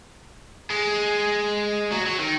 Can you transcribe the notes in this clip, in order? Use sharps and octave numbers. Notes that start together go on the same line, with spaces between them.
G#3
F#3
F#3
D#3